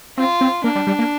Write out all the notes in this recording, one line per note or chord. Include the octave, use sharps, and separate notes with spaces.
C4 F4
C4
A#3 D4
G3
G3
A#3